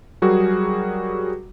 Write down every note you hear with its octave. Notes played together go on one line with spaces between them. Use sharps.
F#3 G3 F#4 G#4 A#4